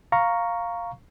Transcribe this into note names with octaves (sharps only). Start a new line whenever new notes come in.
F5 A#5 C#6